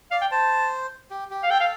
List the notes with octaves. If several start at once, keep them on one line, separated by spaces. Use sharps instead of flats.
D5 F5
G5
C5 A5
G4
G4
F5
A4 G5
F5